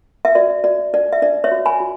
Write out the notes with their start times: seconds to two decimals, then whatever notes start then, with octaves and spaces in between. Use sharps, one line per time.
0.25 E5
0.35 F#4 D5
0.64 F#4 D5
0.93 D4 D5
1.13 E5
1.22 D4 D5
1.44 C#5 E5
1.52 F#4
1.66 G#5 B5
1.80 F#4